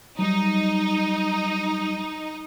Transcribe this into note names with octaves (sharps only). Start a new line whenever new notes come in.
F#3 G3 D#4